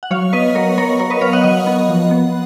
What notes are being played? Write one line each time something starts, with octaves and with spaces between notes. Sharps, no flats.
F#5
F#3 C#5 F5
B3 B4 D#5
F#3 A#4 C#5
B3 A#4 C#5
F#3 A#4 C#5
B4 D#5
B3 C#5 F5
D#5 F#5
F#3 D#5 F#5
B3
F3
B3